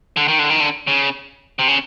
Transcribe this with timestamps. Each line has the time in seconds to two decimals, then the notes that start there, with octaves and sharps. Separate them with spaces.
0.17 D3
0.28 D#3
0.39 D3
0.50 D#3
0.60 D3
0.87 C#3
1.59 C3
1.68 C#3